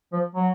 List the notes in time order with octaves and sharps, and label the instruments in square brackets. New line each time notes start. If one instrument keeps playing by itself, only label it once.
[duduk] F3
F#3